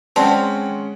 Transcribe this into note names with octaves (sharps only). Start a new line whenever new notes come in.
G#3 C4 C#4 D5 F#5 A5